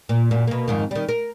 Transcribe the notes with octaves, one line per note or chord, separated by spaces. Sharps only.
A#2
F#2 A#2
B2 A#3
F2 G#2 D#3
D#3 G3
A#4